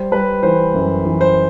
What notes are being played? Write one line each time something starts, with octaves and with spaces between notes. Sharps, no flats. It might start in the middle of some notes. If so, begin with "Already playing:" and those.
Already playing: G3 C5
G3 B4
E3 C5
F#2
E3
C5